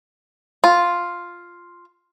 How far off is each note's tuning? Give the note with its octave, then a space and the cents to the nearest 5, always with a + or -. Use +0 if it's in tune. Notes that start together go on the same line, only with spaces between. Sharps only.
F4 +0